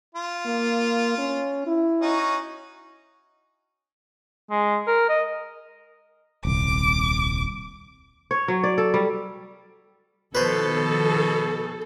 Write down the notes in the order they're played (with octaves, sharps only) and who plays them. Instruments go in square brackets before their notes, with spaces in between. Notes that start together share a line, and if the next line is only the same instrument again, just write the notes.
[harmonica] F4
[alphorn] A#3
C#4
E4
[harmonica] C#4 D#4 F#4
[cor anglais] G#3
A#4
D#5
[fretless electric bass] D#1 C2 [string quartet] D6
[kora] C#5
F#3
D5
A4
G3
[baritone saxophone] B2 [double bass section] D#3 F3 B3 [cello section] A4 [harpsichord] B4 C5